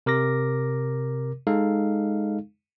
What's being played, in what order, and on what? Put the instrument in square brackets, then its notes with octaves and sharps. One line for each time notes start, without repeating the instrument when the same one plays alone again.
[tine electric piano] C3 A#4 D6 A#6
G#3 D#4 A4 F5